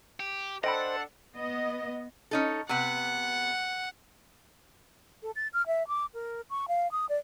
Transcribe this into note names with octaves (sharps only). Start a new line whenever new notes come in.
G4
D4 A4 C5 D#5 F#5 G5 B5
B3 D#5
C#4 D#4 A4
C3 B3 F#5
A4
A6
F6
E5
D6
A#4
C#6
F5
D#6
D5